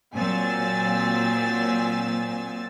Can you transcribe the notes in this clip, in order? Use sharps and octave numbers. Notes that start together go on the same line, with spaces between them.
A#2 F#3 C4 G#5 E6 A6